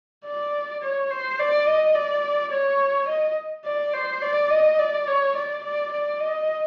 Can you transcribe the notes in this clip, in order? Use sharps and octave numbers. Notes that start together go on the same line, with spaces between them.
D5
C#5
C5
D5
D#5
D5
C#5
D#5
D5
C5
D5
D#5
D5
C#5
D5
D5
D5
D#5